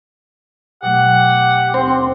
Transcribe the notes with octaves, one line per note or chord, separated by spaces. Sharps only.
B2 F#3 A3 G4 F#5
D#2 C4 C6